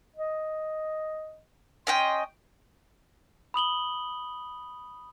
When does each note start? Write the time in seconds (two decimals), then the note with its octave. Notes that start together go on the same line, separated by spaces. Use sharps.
0.16 D#5
1.87 C#4 D#5 G5 C6
3.54 B5 D#6 F#7 G7